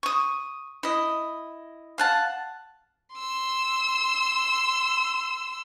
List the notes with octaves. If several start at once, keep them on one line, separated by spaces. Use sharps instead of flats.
C#6 D#6
E4 D#5
F5 F#5 A5
C6 E6